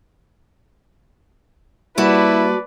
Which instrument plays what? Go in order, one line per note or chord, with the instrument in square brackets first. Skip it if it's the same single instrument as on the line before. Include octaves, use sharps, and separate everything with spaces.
[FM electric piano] G3 A#3 [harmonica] E4 [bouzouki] F#4 A5 [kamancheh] B4 D5